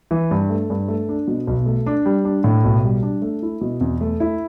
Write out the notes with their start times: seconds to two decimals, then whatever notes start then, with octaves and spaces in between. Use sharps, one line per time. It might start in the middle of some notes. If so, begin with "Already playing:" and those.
0.11 E3
0.31 G2
0.49 A3
0.70 G2
0.88 A3
1.09 D4
1.28 B2
1.47 B1
1.66 A3
1.86 D4
2.06 G3
2.25 D4
2.44 A2
2.64 B1
2.84 G3
3.03 D4
3.22 A3
3.42 E4
3.61 B2
3.81 E2
4.01 A3
4.20 E4